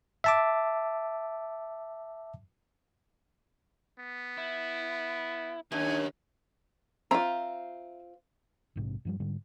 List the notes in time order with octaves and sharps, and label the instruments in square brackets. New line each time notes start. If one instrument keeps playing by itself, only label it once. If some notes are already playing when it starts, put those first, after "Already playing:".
[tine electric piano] E5 A5 D6
[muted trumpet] B3
[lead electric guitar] E4
[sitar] D#2 [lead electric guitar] D#3 C#4 [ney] D4 [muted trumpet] G#5
[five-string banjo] C4 F4 [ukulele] E5 A#5
[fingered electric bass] A#1 G#2 C3
G2 F3 G3
G#2 D3 G3